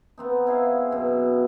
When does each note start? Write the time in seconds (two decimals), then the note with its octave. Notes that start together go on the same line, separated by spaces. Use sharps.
0.18 B3 C4 D#4
0.47 E4 G#4 F5
0.91 F#2 B2